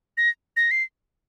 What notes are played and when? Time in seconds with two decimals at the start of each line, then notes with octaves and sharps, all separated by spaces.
0.17 A#6
0.57 A#6
0.71 C7